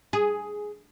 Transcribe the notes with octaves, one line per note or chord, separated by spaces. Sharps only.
G#4